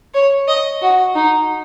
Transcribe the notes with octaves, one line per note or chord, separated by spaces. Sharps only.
C#5
D#5
F#4
D#4